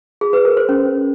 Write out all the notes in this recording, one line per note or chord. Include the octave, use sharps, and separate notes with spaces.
G#4
B4
A#4
C5
C#4